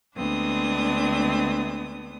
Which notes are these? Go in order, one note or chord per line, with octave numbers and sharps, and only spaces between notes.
D2 G#3 B3 C4 D4 D#6